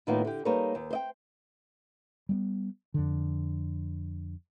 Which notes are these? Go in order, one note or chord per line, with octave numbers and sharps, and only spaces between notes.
A2 D#3 A#3 B3 D#4 F4
D3 G4
G3 A#3 D#4 A4 B4 C#5
D#2
C5 D#5 G5
G3 A3 B3
F2 D3